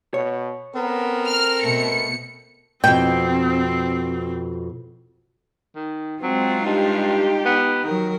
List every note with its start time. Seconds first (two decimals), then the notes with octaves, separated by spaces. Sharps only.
0.14 B2 C#5
0.75 B3 C4 A4 A#4
1.28 F6
1.64 B2 A3 C#7
2.84 F2 B2 C4 G5
5.76 D#3
6.22 F#3 G#3 C4 F4
6.65 G2 D#4 G4
7.45 B3
7.84 D#3 F#3 A#4